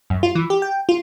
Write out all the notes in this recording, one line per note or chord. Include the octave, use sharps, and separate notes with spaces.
F#2
F4
E3
G4
G5
F4